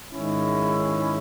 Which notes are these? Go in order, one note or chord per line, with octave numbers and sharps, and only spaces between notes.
G#2 D#3 G#3 C#4 E4